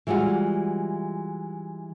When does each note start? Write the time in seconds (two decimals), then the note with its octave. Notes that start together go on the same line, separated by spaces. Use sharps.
0.07 E3 G3 G#3 F4 F#4